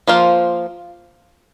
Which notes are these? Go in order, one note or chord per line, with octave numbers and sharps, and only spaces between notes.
F3 A#3 F4 C5